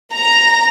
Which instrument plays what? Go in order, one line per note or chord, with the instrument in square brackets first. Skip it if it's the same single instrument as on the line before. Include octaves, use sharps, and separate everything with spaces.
[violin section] A#5